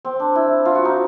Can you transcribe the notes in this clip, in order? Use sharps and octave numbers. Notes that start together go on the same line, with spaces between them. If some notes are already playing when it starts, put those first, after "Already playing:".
C4
D4
E4
F4
F#4
D#4